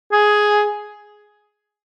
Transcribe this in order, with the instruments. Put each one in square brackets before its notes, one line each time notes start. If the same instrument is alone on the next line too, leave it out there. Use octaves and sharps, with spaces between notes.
[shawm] G#4